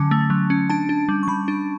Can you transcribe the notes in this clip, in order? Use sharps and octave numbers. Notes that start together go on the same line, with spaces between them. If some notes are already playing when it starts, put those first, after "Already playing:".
Already playing: D3 F#3 C#4 A5
A3
F#3
C#4
D4 A5
D4
G3
C#6
G3 B5
D4